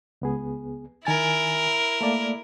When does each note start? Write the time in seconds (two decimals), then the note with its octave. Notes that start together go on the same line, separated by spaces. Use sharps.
0.22 C#2 B3 G#4
1.05 D#3 E4 A#4 G#5 A6
2.01 A3 A#3 D5